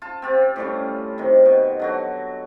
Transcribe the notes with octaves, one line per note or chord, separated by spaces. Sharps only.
F4 A5
C4 F4 G4
A2 G3 C#4
C3 D#3
B2
D3 F#3 F#4